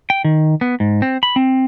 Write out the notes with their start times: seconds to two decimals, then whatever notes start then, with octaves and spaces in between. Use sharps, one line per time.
0.10 G5
0.24 D#3
0.61 B3
0.80 G#2
1.02 C4
1.23 B5
1.36 C4